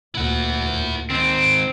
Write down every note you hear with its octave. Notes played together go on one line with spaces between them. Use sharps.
D2 A#2 E4 F#5
D#3 G#3 C4